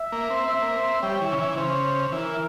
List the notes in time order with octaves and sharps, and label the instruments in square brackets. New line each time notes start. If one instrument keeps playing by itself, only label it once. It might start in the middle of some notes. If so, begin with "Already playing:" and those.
Already playing: [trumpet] E5
[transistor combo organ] A#3
C4
[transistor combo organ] C4 [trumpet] E5
[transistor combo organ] A#3
C4
[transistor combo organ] G3 [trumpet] C#5
[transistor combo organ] E3
C#3
E3
[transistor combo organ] C#3 [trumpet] C5
[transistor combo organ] E3 [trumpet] A#4